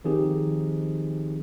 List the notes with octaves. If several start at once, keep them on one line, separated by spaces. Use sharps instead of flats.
D#3 F3 C4 D#4 G4 G#4